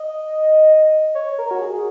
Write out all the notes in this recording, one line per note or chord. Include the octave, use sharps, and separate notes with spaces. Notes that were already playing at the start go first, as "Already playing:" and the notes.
Already playing: D#5
C#5
A#4
F#4
G#4